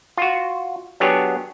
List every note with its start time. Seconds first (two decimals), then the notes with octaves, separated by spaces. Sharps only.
0.17 F4 F#4
1.00 F#3 B3 D4 G4 G#4 C#5